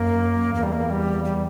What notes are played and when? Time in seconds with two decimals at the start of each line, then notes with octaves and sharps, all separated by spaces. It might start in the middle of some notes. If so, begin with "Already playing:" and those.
Already playing: F#2 A#3
0.54 E2 A#3
0.63 G3
0.72 A#3
0.90 G3
1.24 G3